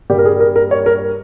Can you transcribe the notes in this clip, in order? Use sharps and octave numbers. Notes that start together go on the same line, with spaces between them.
G2 G3 A#3 G4
A#4
G#4
A#4
A#4
C#5
A#4